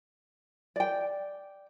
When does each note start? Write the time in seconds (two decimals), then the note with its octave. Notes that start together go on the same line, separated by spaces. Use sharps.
0.76 D5 G5